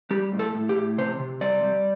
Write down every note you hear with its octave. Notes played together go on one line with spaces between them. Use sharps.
G3 G4
A2
A4
A2
G4
A2
C3 C5
C3
G3 D5
G3